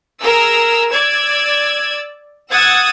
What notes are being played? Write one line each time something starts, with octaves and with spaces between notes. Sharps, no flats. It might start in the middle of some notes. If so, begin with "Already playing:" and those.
G#4 A#4 E6
D5 E6 G#6
F#5 D#6 E6 G#6 A6